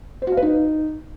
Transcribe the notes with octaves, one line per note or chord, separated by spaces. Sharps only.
C5
F#4
F5
B4
D#4